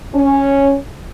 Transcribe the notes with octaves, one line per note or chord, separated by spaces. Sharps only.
C#4